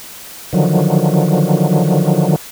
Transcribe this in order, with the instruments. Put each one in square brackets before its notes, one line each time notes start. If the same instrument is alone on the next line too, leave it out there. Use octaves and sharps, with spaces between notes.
[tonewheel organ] D3 D#3 F3 F#3